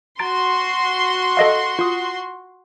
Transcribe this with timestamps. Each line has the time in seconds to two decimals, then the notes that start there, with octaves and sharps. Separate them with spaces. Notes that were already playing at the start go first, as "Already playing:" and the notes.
0.19 F#4 A#5 C6 A6 D7
1.37 A4 D#5 F5
1.79 F4 D#6